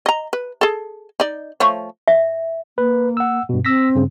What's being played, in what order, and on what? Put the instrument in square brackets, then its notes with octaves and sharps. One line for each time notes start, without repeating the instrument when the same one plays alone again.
[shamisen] D#5 A#5
B4
G#4 A4
D#4 D5
F3 A3 C#5
[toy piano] E5
[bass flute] A#3 [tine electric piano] B4
[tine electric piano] F#5 E6
G2 B2
[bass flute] C4 [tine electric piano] E6 A#6 B6
[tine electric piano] G2 C#3